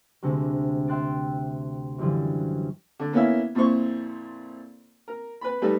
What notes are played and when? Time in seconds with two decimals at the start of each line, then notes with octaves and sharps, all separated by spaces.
0.22 D2 C3 G#3 A3
0.88 E5 G5 C6 F#6 A6 D7
1.98 F#2 D3 E3 F3 G3
3.00 D3
3.13 A#3 B3 C#4 E4 E5
3.55 F2 A#2 E4 C5 C#6
5.08 A#4
5.41 B4 B5
5.62 G3 A3 D#4 A4 B4